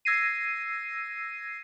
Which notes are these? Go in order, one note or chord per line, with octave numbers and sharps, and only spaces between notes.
E6 G#6 A#6 C7 D#7